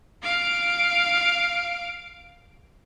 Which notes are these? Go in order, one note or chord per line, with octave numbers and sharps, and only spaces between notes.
F5 D7